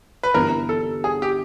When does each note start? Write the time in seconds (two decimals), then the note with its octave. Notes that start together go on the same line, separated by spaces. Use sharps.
0.23 B4
0.34 G1 G2 E3 A#4
0.69 A4
1.04 G#4
1.22 G4